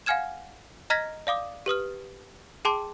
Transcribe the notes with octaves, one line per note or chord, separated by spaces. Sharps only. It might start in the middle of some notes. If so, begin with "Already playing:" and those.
F5 F#5 G#5 F6 G#6 E7
D#5 A#5 F6 G#6 A#6 B6
D5 F5 D6 D#6
G4 B4 D#6 F6
G#4 G5 A5 C6 D6